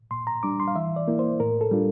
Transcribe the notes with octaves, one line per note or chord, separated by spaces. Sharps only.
A#2 C6
A#5
G3 D4 D6
C6
F5
E3 E5
D5
A#3 E4
C5
A2 A#4
A4
G3 D4 F4